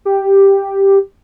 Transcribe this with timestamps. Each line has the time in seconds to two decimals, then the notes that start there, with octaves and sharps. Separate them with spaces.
0.05 G4